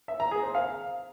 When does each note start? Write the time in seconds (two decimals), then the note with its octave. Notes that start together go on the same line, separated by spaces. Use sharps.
0.08 E5
0.20 A#5
0.31 G#4
0.43 C5
0.55 F5